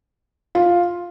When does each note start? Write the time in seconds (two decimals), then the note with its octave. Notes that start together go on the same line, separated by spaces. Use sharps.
0.55 F4